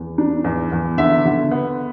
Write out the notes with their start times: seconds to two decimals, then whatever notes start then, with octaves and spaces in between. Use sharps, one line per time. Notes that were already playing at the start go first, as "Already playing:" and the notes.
Already playing: E2
0.18 D4
0.44 E2
0.72 E2
0.98 D3 E5
1.25 D3
1.51 B3